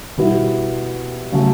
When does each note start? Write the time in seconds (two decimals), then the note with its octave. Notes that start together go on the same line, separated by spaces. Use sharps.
0.17 B2 G3 B3 E4
1.32 C#3 F#3 A3